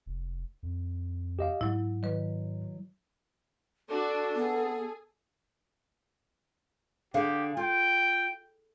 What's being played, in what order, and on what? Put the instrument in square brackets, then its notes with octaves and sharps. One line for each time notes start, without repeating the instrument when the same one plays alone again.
[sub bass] F1
F2
[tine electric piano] G4 D#5 F5
[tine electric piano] G#2 [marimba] F#3 E4
[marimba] D#3 B4 [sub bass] F#3
[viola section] D4 F#4 [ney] A4
[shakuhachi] B3 [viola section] G#4
[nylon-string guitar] D3 G#4 F5 [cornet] G4
[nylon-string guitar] F4 [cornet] G5